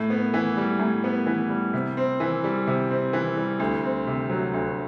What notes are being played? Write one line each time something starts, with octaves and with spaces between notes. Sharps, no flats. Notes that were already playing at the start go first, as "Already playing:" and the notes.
Already playing: A2
B3
E3
G3
A2
B3
E3
G3
C3
C4
E3
G3
C3
C4
E3
G3
D2
C4
C3
F#3
D2